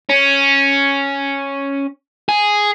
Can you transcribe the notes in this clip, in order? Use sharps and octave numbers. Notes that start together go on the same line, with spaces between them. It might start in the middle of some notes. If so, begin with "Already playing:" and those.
C#4
G#4